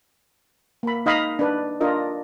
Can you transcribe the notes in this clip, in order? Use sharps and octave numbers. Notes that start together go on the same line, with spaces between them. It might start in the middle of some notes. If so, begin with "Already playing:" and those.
A#3 B5
D#4 D#5 F5 B5
D4 B4
D4 F4 A#4 D#5